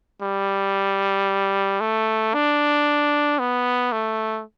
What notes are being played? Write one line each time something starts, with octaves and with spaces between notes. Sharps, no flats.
G3
A3
D4
B3
A3